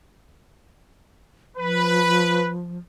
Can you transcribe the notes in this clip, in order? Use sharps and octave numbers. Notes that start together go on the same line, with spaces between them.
F3 B4